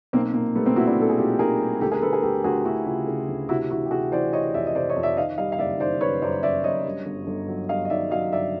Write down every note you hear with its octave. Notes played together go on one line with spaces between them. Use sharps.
B1 A#3 C4
A#2 A#3
G3 A3 B3
A#3 C4
A#2 E4 F#4
D4 E4
B1 A4
G#4
B1 F4 G4
B1 G#4 A#4
G3
D2 G4 A4
G#4 A#4
D2 A4 B4
G#4 A#4
D2 G4 A4
D2 F#4 G#4
D2 E4 F#4
C#3 F4 G4
C#3
D2
C3 E4 F#4
E3 E4 F#4
G4
C3 F#4 G#4
E3 C5 D5
E3 C#5 D#5
F2 D5 E5
D#5
C3 C5 D5
C#5 D#5
F2
D5 E5
D#3 D#5 F5
G3 D#5 F5
F5
F#1 D5 E5
D#3 C5 D5
F#1 B4 C#5
F#2 C5 D5
F#2 D5 E5
F#2 C#5 D#5
G2
G1
G1
F#3
G2 D#5 F5
D#5
D#3 D5 E5
F#3 D#5 F5
G1 D5 E5